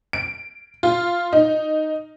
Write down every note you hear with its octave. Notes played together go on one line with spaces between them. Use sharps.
D7
F4
D#4